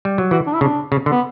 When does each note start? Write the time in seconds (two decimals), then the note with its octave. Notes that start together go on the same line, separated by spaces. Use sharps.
0.05 G3
0.18 F#3
0.31 E3 F#4
0.47 D4
0.54 E4
0.61 C#3 D4
0.92 C#3
1.06 D3
1.10 B3